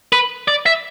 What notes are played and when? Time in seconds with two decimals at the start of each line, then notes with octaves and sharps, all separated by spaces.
0.12 B4
0.48 D5
0.66 E5